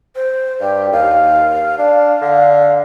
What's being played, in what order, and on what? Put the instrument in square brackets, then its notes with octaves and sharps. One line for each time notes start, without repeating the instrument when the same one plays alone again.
[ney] C5
[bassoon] G2 [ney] G4
[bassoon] D#2 [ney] F5
[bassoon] D4 [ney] F5
[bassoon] D3